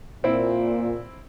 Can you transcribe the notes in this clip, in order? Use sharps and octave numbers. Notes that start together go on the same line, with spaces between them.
A#2 C4 E4